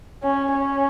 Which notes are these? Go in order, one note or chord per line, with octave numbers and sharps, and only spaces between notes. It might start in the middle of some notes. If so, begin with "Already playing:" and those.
C#4
C#4